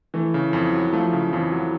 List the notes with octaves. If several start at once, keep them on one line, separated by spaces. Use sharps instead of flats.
E3 A3
C#3
F2
F#3
F3 A3
C#3
F2 E3
F#3